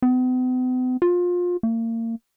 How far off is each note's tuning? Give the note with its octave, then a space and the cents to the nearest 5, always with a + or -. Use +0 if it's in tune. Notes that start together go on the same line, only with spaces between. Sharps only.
B3 +45
F4 +25
A#3 -35